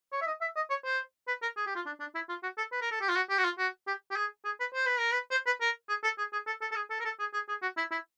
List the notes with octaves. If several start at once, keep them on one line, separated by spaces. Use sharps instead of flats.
C#5
E5
D#5
E5
D#5
C#5
C5
B4
A#4
G#4
G4
F4
D4
D4
E4
F4
F#4
A4
B4
A#4
A4
G4
F4
F#4
G4
F#4
F4
F#4
G4
G4
G#4
G#4
B4
C5
B4
A#4
B4
C5
B4
A#4
G#4
A4
G#4
G#4
A4
A4
A4
G#4
A4
A#4
A4
G#4
G#4
G#4
F#4
E4
E4